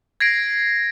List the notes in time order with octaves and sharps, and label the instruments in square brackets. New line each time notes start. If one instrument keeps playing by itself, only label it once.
[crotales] G#6 A#6 C7 D7